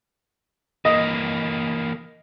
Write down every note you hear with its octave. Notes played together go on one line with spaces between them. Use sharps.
E3 A#3 D#5